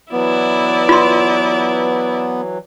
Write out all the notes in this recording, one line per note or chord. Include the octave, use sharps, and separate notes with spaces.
E3 F#3 B3 E4 D5
F4 C6